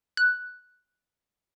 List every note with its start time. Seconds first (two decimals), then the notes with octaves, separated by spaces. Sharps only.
0.17 F#6